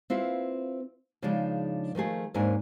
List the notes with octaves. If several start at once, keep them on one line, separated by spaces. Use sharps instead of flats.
C4 E4 F4 B4
C#3 F3 G#3 D4 D#4
D#3 F3 A3 G#4
D#2 G#2 C4 D4 A#4 G#5